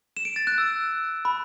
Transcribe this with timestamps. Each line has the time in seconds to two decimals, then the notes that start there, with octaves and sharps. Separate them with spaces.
0.17 E7
0.25 D7
0.36 A6
0.47 F#6
0.58 E6
1.25 B5